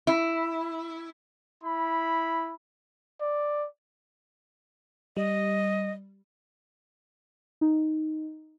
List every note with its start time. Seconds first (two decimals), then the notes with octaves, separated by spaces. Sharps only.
0.07 E4
1.64 E4 B5
3.21 D5
5.17 G3 D#5
7.61 D#4